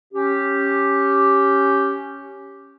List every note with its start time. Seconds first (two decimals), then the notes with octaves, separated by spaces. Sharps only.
0.14 C#4 G4